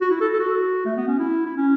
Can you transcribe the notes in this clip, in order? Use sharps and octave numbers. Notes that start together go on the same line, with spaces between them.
F#4
E4
A4
A4
F#4
A3
B3
C#4
E4
E4
C#4